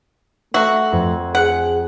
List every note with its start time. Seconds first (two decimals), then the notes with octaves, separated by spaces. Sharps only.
0.54 A3 F#4 E5 A#5
0.93 F2
1.35 G#4 F#5